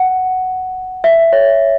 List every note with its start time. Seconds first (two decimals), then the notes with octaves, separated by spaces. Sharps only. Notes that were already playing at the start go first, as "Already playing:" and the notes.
Already playing: F#5
1.04 E5
1.33 C#5